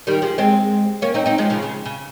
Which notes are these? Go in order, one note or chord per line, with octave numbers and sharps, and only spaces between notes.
D#3 G3
F3 G#3
G#3 C4
A#3 C#4
C4 D#4
C4 D#4
F3 G#3
C#3 F3
C#3
C#3